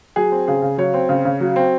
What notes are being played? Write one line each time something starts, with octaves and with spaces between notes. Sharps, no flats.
F#3 G#4
C4
C#3 G#4
C#3
F#3 C#5
C4
C#3
C#3
F#3
C4